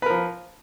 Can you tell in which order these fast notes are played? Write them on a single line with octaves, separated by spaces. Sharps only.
B4 A#4 F3